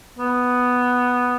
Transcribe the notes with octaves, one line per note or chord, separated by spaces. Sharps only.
B3